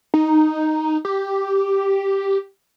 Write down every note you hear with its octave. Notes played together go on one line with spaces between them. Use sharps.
D#4
G4